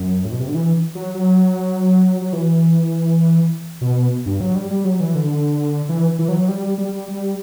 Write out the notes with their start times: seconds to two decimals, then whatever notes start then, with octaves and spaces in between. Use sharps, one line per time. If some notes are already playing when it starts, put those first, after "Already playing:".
Already playing: F#2
0.25 A2
0.32 B2
0.40 C3
0.48 D3
0.55 E3
0.95 F#3
1.15 F#3
2.22 F#3
2.33 E3
3.81 B2
4.26 G2
4.40 F#3
4.55 G3
4.71 G3
4.85 F#3
5.00 E3
5.15 D3
5.89 E3
6.19 E3
6.29 F#3
6.48 G3
6.78 G3
7.08 G3